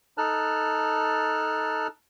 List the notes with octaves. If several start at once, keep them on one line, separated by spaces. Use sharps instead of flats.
D#4 A4 A5 F6 F#6